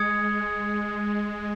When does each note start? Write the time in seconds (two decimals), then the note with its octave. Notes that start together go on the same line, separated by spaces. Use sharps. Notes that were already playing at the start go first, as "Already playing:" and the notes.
Already playing: G#3 D#6 G#6 C#7